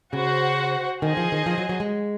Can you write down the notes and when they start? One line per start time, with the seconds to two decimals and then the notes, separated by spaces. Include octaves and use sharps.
0.13 C#3 F#4 C5 F#5
1.02 D#3 G#4 C5 D#5 G#5
1.17 F3
1.32 D#3
1.46 F3
1.58 F#3
1.69 F#3
1.80 G#3